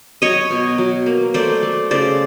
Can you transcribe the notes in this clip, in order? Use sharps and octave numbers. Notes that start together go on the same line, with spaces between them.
F#3 C#5 D#5
B2
F#3
A#3
A3 C5 D5
A3
C#3 C5 D5